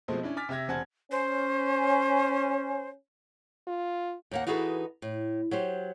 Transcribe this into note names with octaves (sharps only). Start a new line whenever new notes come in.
B2 F3 G#3 A3 C4
C#4 D4 E4
G#5 D6 F6 A6 B6
C3 G4 E5 G#6 A#6
E1 C4 F#5 G#5 A5 G#6
C#4 C5
F4
D#2 A#3 F#5
E3 D#4 F#4 G#4 A4 B4
A2
F#3 G4 C5